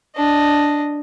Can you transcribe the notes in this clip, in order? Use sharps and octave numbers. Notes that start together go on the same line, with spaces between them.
D4 D#5